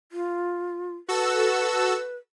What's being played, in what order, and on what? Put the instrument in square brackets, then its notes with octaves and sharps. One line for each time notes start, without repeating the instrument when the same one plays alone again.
[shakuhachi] F4
[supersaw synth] F#4 A4 E6 [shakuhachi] B4